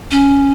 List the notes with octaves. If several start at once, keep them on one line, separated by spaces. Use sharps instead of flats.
C#4